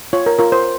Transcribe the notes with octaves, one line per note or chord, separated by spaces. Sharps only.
F4 C#5
A#4
F4 A#4
C5